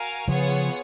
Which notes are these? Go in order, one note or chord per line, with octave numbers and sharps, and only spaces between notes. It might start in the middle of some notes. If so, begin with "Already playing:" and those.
Already playing: F#4 A#4 F5 G#5
C#3 F3 B3 F4 G#4 C#5 F#5